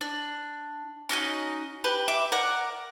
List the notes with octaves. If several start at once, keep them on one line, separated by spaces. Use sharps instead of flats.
D4
C#4 D#4 F#4 D#5
G4 B4
E5 D6
A#4 D5 F#5